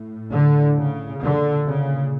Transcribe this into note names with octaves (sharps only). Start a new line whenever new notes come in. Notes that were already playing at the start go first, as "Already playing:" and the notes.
Already playing: A2
D3
C#3
A#2 D3
C#3